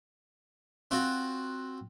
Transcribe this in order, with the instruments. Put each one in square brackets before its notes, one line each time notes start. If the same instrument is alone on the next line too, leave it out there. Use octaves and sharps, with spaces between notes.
[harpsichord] C4 F4 F#4